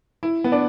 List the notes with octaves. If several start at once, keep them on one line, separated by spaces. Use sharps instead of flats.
E4
B3
D4